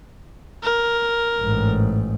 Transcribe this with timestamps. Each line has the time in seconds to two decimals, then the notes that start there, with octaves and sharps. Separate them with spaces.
0.63 A#4
1.39 A1 G#2